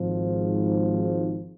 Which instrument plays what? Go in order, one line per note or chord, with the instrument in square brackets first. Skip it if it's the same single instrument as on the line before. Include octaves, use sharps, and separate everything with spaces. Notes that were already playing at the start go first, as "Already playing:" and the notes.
Already playing: [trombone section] G#1 G#2 F3